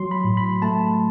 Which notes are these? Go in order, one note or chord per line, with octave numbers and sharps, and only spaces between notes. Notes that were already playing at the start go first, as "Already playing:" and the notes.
Already playing: F#3 C6
B5
A2
B5
A3 A5